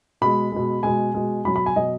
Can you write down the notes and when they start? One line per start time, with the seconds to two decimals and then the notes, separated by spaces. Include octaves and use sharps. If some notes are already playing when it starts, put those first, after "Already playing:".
0.21 B2 G#3 B5
0.52 B2 G#3
0.83 B2 G#3 G#5
1.14 B2 G#3
1.45 B2 F#3 B5
1.56 B5
1.66 G#5
1.76 B2 F#3 D#5